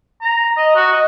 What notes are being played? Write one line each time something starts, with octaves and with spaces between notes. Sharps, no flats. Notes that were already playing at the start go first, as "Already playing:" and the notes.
A#5
D#5
F#4
D#5